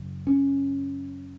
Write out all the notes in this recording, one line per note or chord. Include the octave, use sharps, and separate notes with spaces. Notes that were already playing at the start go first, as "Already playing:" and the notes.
Already playing: F#2 C#3
C#4